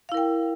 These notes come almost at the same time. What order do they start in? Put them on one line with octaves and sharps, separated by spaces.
F5 E4 A#4 G5